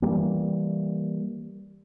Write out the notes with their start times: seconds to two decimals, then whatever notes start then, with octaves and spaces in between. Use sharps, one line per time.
0.02 E3 G3 A#3